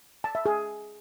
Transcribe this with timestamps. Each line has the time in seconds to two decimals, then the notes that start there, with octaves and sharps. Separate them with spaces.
0.24 A5
0.35 E5
0.46 G#4